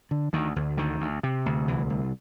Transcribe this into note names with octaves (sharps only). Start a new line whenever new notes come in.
D3
D2 D#3
D2
D3 D#3
D2
C3
D2
C2 E3
C2